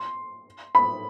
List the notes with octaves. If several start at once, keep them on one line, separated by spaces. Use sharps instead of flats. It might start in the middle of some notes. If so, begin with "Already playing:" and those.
Already playing: C6
B5